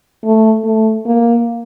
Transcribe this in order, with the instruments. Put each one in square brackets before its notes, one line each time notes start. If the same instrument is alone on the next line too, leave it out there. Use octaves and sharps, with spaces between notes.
[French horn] A3
A3
A#3